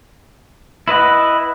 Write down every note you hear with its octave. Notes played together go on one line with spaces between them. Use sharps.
E4 B4 D#5 F#5